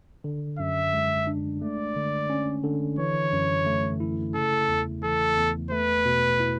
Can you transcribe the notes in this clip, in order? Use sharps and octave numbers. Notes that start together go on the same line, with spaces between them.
D3
F#2 E5
G#3
D4
A3 D5
D3
C#4
D3
E3 C#5
F#2
A3
E4
C#3 A4
E2
E3 A4
E2
A3 B4
B2
E4